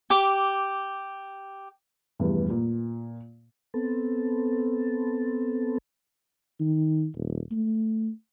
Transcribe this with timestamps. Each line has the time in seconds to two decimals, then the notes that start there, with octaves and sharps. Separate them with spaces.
0.10 G4 D6
2.19 F1 E2 G2
2.50 A#2
3.74 B3 C4 A4
6.60 D#3
7.15 D#1
7.51 A3